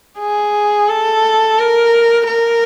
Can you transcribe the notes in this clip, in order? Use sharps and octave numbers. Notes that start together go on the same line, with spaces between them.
G#4
A4
A#4
A#4